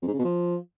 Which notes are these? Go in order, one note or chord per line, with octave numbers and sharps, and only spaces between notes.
F2
G#2
C#3
B2
F3